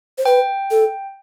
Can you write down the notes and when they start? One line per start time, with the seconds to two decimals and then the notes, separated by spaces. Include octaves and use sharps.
0.18 C5
0.25 B4 G5
0.71 A4